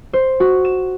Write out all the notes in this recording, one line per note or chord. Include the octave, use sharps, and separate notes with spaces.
C5
F#4
E7